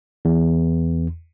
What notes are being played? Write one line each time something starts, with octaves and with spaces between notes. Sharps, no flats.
E2